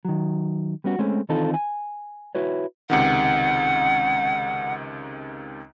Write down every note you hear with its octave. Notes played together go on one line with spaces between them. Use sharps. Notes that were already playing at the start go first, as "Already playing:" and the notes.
D#3 F#3
G3 B3 C#4 F#4
G#3 A3 C4 C#4
D#3 E3 C4 D#4 F4 A4
G#5
E4 F#4 B4 C#5
C#2 C3 D#3 F#5